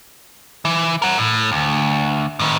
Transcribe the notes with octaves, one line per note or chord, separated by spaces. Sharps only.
E3
A#4 F#5
A2
D2
A2 D#3